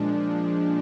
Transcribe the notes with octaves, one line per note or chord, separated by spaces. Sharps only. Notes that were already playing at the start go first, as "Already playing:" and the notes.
Already playing: A#2 F3 G#3 D4